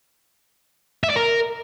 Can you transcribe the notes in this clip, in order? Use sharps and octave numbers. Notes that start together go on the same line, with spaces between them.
E5
D5
A#4